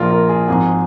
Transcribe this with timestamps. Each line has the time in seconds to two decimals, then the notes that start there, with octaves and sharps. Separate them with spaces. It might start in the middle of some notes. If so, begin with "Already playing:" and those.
Already playing: A#1 A#2 F3 F4 A#4
0.11 A#4
0.29 G#4
0.48 G#1 G#2 F3 G#4